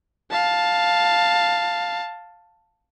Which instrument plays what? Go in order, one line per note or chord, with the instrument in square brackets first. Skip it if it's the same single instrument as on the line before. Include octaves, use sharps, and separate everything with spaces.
[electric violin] F5 A5